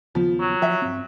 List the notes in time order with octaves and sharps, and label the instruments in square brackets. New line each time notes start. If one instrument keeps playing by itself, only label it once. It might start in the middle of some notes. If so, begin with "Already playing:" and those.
[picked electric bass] D#2 C#3 B3 [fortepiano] F3
[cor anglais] F#3
[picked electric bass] F3 [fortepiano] E5
[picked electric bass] G2 C4